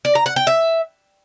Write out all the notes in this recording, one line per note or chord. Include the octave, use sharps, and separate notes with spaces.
D5
A#5
F#5
G5
E5